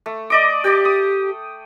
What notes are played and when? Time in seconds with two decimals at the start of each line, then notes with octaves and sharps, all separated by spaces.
0.06 A3
0.30 D5 D#5 D6
0.64 G4 D5 G5
0.85 D#6